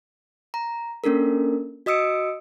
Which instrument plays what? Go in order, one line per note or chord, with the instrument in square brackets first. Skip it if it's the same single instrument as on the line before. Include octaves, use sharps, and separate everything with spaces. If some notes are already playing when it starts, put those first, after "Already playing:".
[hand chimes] A#5
A#3 C#4 D4 A4 A#4
F#4 D#5 D#6 E6 C#7 D7